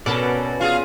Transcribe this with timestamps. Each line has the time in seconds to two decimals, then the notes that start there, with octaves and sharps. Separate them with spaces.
0.06 B2 C#4 F#4 A4 A#4 D5
0.61 F4 G#4 F5